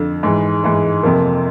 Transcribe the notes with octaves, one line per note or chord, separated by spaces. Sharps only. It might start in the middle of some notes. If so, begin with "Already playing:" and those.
Already playing: F2 D3 F3
G#2 E3 G#3
G#2 E3 G#3
F2 C3 F3 A#3